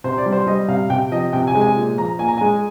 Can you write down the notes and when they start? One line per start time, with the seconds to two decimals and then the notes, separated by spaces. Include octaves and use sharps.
0.04 C3 C5
0.18 D5
0.26 G3
0.33 C5
0.47 G3 D#5
0.68 C3 F5
0.90 C3 G5
1.12 F3 D#5
1.33 C3 G5
1.47 G#5
1.55 G#3
1.61 G#5
1.76 A#2
1.98 F3 A#5
2.19 A#2 G#5
2.28 A#5
2.38 G#3 G#5